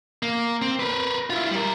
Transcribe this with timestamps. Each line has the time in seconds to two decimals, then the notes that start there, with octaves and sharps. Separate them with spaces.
0.23 A#3
0.62 C4
0.79 A#4 B4
1.30 E4 F4
1.51 G3 A#4